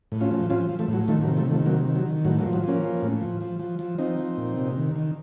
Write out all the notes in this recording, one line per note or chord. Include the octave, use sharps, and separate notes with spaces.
A2
C#4 F4
F3
F3 C#4 F4
F3
F3 A3
A2
F#3
D#3 F3 A3
F#3 A#3
C3
F3 A3
D#3 F3 A3
C3 F#3 A#3
D#3
F#3
D#3
A2 F#3
F#3 A#3
F3
F#3
F3 A#3 C#4
F3
A2
F3
F3
F3
F3
F3 C4 D#4
F3
A#2
C3
D#3
D#3